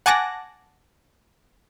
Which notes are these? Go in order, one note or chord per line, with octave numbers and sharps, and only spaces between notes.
F#5 G#5 A5 D6 F#6 A#6